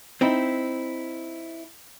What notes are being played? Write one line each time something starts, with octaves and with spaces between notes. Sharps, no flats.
C4 D#4 E4